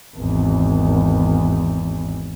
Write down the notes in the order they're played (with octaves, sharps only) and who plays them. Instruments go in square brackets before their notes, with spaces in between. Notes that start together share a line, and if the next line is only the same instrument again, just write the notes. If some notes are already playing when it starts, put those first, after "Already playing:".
[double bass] G#1 E2